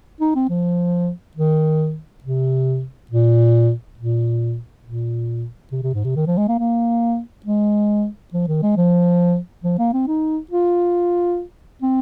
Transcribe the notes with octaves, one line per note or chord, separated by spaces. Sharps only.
D#4
C4
F3
D#3
C3
A#2
A#2
A#2
C3
C3
G#2
C3
D#3
F3
G#3
A#3
A#3
G#3
F3
D#3
G#3
F3
F3
A#3
C4
D#4
F4
C4